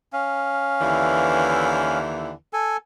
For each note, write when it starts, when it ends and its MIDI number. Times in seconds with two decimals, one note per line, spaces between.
0.13 1.99 61
0.13 1.99 77
0.82 2.32 39
0.82 2.32 50
0.82 2.32 52
2.53 2.77 69
2.53 2.77 80